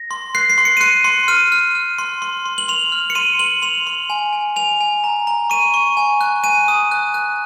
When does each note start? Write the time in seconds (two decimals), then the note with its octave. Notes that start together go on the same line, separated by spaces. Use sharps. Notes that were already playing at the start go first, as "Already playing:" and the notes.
Already playing: A#6
0.11 C6
0.35 F#6 C7
0.50 C7
0.58 C6
0.65 C#7
0.77 D#7
0.81 F#6 C#7
1.04 C6
1.28 F6 D#7
1.52 F6
1.75 F6
1.99 C6
2.22 C6
2.46 C6
2.58 F#7
2.68 C6 F7
2.92 F6
3.10 C#7
3.15 C6 D#7
3.39 C6 F#7
3.62 C6 F7
3.87 C6
4.10 G#5
4.33 G#5
4.56 G#5 F7
4.81 G#5
5.04 A#5
5.27 A#5
5.50 C#6 D#7
5.74 C#6
5.97 G#5
6.21 F#6
6.44 G#5 D#7
6.68 D#6
6.91 F#6
7.14 F#6